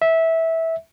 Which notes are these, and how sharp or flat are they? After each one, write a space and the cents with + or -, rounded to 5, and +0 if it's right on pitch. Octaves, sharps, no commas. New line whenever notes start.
E5 -15